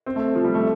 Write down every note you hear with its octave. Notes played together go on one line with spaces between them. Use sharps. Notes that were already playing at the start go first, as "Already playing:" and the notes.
C4
A3
F3
G3
A3